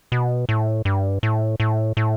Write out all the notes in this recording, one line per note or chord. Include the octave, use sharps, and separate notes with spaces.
B2
A2
G2
A2
A2
A2